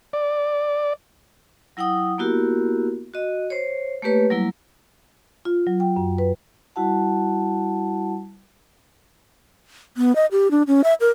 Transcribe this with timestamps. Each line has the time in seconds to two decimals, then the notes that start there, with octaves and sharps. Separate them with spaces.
0.13 D5
1.77 F#3 E4 F#5 G5 D#6
2.18 A#3 B3 E4 F#4 G4 A#4
3.14 F#4 D#5
3.50 C5 C#5
4.02 A3 A#3 G4 B4 C#5
4.30 F#3 G3 A#3 E4
5.45 F4
5.67 F#3
5.80 G5
5.96 F#2
6.18 B4
6.76 G3 E4 F#4 F#5 A5
9.97 B3
10.16 D#5
10.32 G4
10.51 D4
10.67 C#4
10.84 E5
11.01 A#4